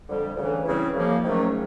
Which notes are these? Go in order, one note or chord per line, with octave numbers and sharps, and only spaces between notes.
F2 D3 G3
D2 C#3 E3
C#3 E3 G3 C4 E4
F#2 C#3 F3 A#3
G#2 D#3 F#3 A3 C#4